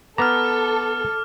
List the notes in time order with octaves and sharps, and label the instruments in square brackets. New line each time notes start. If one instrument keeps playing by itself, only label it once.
[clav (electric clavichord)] B3 A#5 [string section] A4 [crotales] D6 F6